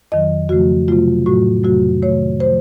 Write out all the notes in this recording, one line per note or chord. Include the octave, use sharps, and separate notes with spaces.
F2 D#3 F#3 D#5
F2 C#3 F3 A3 F#4
C3 F#3 A3 F4
A2 F#3 A3 F#4
F2 C3 F#3 A3 F#4
C3 D#3 A3 C#5
F3 A3 C5